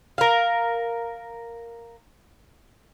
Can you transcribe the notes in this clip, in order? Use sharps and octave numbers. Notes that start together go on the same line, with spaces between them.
A#4 F5